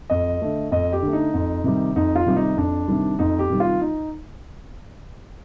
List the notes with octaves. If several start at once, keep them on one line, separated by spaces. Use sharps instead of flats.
F2 D#5
D3 A3
F2 D#5
G4
D3
A3
D#4
F2
C3 D#3 G3
F2 D#4
F4
C3 D#3 G3
D#4
F2 D4
C3 D#3 G3
F2 D#4
G4
C3 D#3 G3
F4
D#4